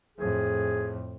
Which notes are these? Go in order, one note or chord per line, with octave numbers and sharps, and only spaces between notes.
F2 A2 G#4